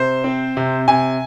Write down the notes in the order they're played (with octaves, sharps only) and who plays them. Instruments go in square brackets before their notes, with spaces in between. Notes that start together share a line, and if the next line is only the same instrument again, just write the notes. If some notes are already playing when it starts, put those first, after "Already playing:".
Already playing: [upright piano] C3 C5
C4
C3
C3 G#5